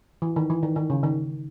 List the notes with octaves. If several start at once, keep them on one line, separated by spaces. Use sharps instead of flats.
E3
D#3
E3
D#3
D#3
C#3
D#3